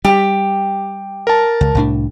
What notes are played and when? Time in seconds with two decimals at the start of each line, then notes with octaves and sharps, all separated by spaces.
0.05 G3 G4
1.27 A#4 A5
1.61 C#2
1.75 C2 A2 D4